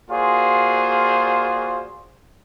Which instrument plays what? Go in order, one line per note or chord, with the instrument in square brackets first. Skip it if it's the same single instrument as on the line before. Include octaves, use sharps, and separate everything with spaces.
[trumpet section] A#3 F4 F#4 G#4 C5 D5